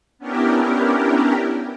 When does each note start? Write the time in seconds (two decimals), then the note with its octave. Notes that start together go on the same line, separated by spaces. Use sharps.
0.19 B3 C#4 D4 E4 G4 A#4